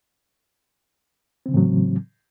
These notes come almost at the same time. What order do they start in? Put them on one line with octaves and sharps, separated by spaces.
C4 C#3 E3 A2 F#3